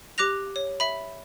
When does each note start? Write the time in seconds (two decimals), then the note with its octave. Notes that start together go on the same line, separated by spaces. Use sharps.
0.18 G4 D6 F#6 A#6 F7
0.56 C#5
0.80 E5 B5